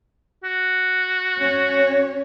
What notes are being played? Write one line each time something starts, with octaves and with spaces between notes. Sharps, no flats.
F#4
C#4 C#5